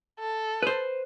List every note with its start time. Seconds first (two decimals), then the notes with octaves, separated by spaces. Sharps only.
0.19 A4
0.63 B4 C5